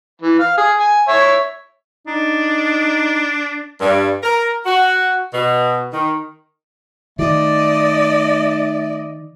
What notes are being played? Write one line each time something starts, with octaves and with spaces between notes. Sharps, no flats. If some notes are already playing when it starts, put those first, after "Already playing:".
E3
F5
G#4
G#5
C#5 E5
D4 D#4
G2
A#4
F#4
B2
D#3
D#3 A3 D5 D#5